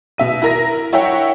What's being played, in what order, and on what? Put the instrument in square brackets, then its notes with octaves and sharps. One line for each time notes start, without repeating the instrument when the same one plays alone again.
[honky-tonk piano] B2 E5 D#7
E4 A#4 A#6
E4 C#5 E5 F#5 G5